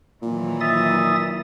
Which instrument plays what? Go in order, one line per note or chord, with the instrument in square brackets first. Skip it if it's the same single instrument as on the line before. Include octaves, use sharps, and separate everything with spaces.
[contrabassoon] A#2 [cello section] D#3 E3 F#3
[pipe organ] E5 D#6 A6